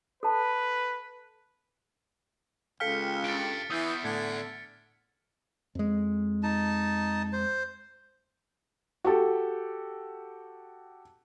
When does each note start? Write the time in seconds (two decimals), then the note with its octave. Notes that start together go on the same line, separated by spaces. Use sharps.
0.23 A4 B4 A5
2.80 C#2 A4 F5 G5 F6 B6 C#7
3.24 G2 A6 D7
3.70 E2 E3 D#6 E6 G6
4.04 A2 D3 G#6
5.75 F2 G#3
6.43 D#4 A5
7.33 C5
9.04 F#4 G4 A4